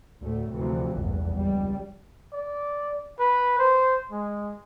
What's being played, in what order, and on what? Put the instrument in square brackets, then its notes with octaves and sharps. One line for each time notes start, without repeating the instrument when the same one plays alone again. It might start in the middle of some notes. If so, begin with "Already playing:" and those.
[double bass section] D2 A2 A3
D2 C3 E3 F3
F1 A#1 E2 G2
C#2 G3
[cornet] D5
B4
C5
G#3